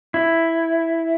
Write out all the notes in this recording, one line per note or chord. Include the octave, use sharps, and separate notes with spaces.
E4